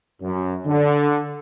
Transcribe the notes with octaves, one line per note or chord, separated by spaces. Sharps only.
F#2
D3